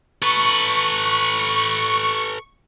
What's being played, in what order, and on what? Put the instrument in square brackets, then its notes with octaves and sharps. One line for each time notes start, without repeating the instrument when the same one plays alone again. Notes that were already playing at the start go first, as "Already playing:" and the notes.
[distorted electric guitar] A4 B4 [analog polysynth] C#6